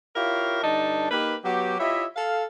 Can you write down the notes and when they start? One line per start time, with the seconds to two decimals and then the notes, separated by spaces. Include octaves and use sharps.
0.16 E4 F4 G4 A#4 C#5 F5
0.63 G2 D3 D4 D#4 A5
1.11 A#3 D#4 G4 B4
1.44 F#3 B3 F#4 G4
1.80 E4 F4 G4 C#5 D#5 E5
2.16 A4 F5